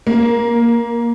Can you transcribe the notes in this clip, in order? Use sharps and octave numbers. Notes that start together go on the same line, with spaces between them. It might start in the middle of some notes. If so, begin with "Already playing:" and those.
A#3